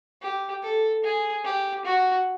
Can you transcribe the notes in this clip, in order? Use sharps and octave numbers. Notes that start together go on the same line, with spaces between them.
G4
A4
G#4
G4
F#4